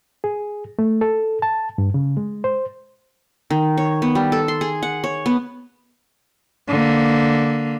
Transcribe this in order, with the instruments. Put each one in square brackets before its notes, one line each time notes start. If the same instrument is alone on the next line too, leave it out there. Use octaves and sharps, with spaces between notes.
[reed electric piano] G#4
A3
A4
A5
G2
C#3
G#3
C5
[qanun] D#3
C#5
B3
G3
A4
C6
G#4
F#5
C#5
B3
[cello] D3 A#3